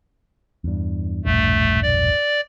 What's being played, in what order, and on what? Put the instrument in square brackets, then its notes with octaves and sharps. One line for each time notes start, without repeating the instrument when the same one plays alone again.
[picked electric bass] E2 G2
[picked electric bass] E1 A#1 G2 [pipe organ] A3
[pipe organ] D5